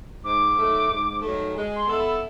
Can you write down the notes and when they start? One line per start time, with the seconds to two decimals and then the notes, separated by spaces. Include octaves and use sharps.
0.24 G#2 D6
0.57 D#3 F#3 A3
0.89 G#2
1.21 D#3 F#3 A3
1.55 G#3
1.76 C6
1.87 B3 E4 A4
1.98 B5